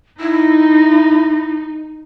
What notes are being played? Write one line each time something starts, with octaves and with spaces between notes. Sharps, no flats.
D#4 E4